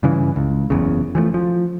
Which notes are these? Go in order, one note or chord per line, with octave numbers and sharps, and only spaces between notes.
G2 C#3 E3
C#2
F#1 E2 C#3
E3 F3 G3 A3
F3